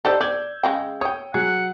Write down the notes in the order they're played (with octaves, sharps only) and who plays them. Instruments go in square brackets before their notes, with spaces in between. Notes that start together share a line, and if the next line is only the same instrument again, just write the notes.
[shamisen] D#4 G4 A4 [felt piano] C5 D5 E6
[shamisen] D5 [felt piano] G6 G#6
[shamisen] C#3 G#3 G5
[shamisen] C#5 G5 [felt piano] D#6
[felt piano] F#3 [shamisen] G#4 [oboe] F#5